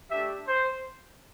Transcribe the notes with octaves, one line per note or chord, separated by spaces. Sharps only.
A3 D4 G4 E5
C5